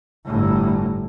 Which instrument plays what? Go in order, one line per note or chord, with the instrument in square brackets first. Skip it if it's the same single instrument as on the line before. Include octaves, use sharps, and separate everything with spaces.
[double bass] G1 A2